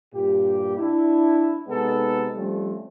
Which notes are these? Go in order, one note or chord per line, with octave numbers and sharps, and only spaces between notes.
G2 A#2 G4
D4 E4
C3 G#3 B3 D#4 A4
F3 G3 A3 C4 C#4